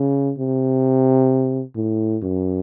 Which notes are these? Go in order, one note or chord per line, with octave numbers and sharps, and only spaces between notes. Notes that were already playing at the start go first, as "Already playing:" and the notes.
Already playing: C#3
C3
A2
F#2